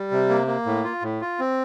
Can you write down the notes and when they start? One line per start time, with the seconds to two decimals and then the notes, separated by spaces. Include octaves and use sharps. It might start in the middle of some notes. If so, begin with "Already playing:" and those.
Already playing: G3
0.11 C3
0.29 A#3
0.47 A#3
0.66 A2
0.84 F4
1.02 A2
1.21 F4
1.39 C4